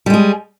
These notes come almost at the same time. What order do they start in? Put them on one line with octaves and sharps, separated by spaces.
G3 G#3 G#4